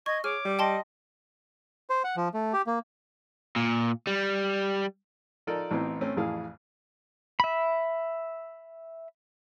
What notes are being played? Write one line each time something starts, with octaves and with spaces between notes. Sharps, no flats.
D#5 C#6 G#6
G#4 C#5 D6 F6
G3
D#5 G5 A5 C6
C5
F#5
F3
A3
G4
A#3
A#2
G3
F3 D#4 A4 A#4 D5
A1 E3 B3 C4 D#4 E4
A3 C4 C#4
A1 F2 E3 G#4 F5
E5 B5